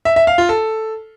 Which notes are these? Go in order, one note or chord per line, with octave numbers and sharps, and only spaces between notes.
E5
E5
F5
F4
A4